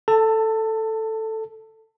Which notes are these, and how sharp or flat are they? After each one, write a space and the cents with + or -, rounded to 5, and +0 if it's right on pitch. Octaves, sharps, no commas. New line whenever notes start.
A4 +0 A5 +25